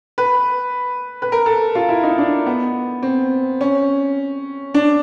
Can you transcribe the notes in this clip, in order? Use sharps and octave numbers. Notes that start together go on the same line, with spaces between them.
B4
B4
A#4
A4
F4
E4
D#4
D4
B3
C4
C#4
D4